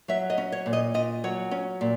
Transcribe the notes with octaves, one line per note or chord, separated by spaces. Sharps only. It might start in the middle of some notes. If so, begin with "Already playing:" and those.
F#3 E5
D#5
C#4
C#5
A#2
D#5
A#2 D#5
F#3 C#5
C#4
A#2